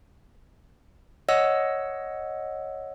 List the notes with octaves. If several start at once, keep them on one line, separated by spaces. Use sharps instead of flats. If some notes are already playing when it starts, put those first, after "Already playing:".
C#5 D#5 F#5 E6